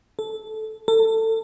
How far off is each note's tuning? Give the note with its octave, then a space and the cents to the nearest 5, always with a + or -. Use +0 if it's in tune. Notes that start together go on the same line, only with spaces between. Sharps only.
A4 -15
A4 +25